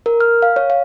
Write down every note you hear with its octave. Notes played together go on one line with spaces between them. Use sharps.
A#4
F6
F5
C#5
F5